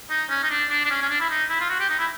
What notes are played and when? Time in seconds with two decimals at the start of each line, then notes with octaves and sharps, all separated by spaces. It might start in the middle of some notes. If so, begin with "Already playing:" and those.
0.10 D#4
0.30 C#4
0.43 D#4
0.51 D4
0.70 D4
0.85 D4
0.90 C#4
1.02 C#4
1.10 D4
1.20 E4
1.30 D#4
1.50 E4
1.60 F4
1.70 F#4
1.80 G4
1.90 D#4
1.99 E4